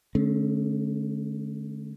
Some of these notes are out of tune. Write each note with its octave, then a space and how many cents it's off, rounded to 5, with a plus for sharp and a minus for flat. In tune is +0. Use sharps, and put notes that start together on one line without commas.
D3 +5 A3 -45 C#4 -35